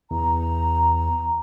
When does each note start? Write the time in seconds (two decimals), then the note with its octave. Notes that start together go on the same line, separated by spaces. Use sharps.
0.11 E2 A#5